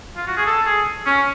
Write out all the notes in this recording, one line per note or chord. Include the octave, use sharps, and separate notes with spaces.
F4
F#4
G#4
A4
G#4
C#4